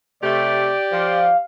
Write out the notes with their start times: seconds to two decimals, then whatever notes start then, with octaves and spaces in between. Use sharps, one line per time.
0.23 C3 A3 G4 D5
0.92 F3 F5